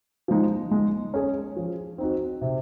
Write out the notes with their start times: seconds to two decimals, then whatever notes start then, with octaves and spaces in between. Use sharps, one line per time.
0.28 F3 G#3 D#4
0.71 G#3
1.14 C#4 G#4
1.56 F3
1.98 C4 D#4 F#4
2.41 C3